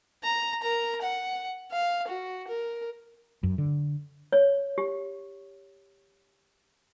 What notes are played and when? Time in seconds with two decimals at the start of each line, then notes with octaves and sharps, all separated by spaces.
0.24 A#5
0.62 A#4 A#5
1.01 F#5
1.72 F5
2.08 F#4
2.48 A#4
3.43 F#2
3.58 D3
4.32 C#5
4.78 G4